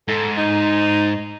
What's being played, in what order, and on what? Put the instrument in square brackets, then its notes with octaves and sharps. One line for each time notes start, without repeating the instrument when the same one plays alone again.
[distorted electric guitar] G#2 [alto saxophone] A4
[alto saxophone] D#4